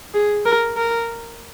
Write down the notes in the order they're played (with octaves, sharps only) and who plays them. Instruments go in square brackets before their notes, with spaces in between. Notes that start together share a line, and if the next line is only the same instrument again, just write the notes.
[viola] G#4
A#4
A#4